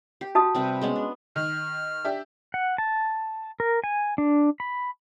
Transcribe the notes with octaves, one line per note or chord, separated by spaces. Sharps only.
G4
F#4 A5 D#6
C3 G3 B4
G#3 B3 C#4
D4
D#3 F6
D4 G4 E5
F#5
A5
A#4
G#5
D4
B5